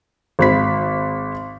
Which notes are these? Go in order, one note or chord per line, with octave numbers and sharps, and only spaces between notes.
G#1 B5 B6